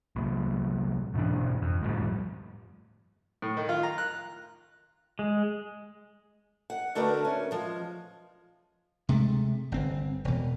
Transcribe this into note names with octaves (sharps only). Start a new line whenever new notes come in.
C2 A#2
G#2 B2 E3 D4
F2
G1 A2 F3 G3
A2
D#3
F4
A#5
F#6
G#3
F#5
D3 A3 D4 F#4 A#4 B4
C#4
F3 G#3
C3 G#3 A3
G1 C4
E1 B2